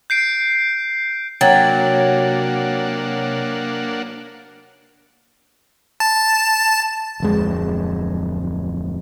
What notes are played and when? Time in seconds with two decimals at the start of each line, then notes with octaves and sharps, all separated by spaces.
0.10 G6 C7 D7
1.41 C3 F#3 A#3 D4 C#5 F#5 G5 A6
6.00 A5
7.20 D1 F2 G#3